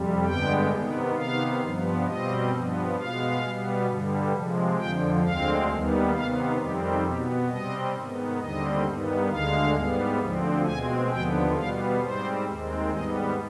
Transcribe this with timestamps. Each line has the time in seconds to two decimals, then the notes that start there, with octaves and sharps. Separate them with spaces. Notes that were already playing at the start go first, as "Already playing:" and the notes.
Already playing: F2 C3 G3
0.25 G2 D3 G#3 B3 G5
0.71 C3 D#3 B3
1.16 C3 D#3 B3 F5
1.61 G2 F3 B3
2.06 B2 G3 C4 D#5
2.51 G2 F3 B3
2.96 B2 G#3 B3 F5
3.42 B2 G3 B3
3.87 G2 D3 G3
4.32 C3 F3 G#3
4.77 F2 D3 F3 G5
5.22 D2 D3 G#3 C4 F5
5.68 D#2 D#3 G3 B3
6.13 C3 D#3 B3 F5
6.58 F2 D#3 G3 C4 G4
7.03 B2 B3 G4
7.48 C3 G3 C4 D#5
7.94 G#2 D#3 B3
8.39 D#2 D3 G3 C4 D#5
8.84 G2 D#3 B3
9.29 D2 D3 G#3 F5
9.74 G#2 G3 B3
10.19 D2 D3 F3 C4
10.65 B2 G#3 C4 G#5
11.10 D#2 D3 F3 B3 G5
11.55 B2 G3 B3 F5
12.01 G#2 G3 C4 C5
12.46 D#2 D#3 G#3 C4
12.91 G#2 G3 B3 D#5